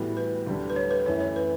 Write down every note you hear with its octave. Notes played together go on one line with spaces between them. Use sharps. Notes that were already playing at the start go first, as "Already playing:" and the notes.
Already playing: A2 E3 G3 B3 F#4
B4
D2 D3 G3 D4
B4
C#5
B4
F#2 E3 A3 E4 C#5
C#5
B4